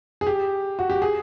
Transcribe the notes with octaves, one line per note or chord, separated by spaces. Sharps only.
G#4
G4
F#4
G4
G#4